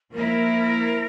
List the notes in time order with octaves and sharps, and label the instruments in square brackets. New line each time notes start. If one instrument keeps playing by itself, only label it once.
[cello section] F3 A#3 E4 [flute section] A#4